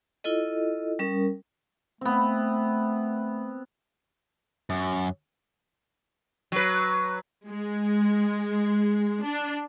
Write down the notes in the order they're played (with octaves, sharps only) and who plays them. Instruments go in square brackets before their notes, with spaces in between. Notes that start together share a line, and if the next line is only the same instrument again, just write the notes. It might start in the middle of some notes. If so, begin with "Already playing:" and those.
[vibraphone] E4 F4 A4 D#5
G3 C#4 A#4
[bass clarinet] A3 [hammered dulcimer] B3 C4
[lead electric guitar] F#2
[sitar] F#3 B4
[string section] G#3
D4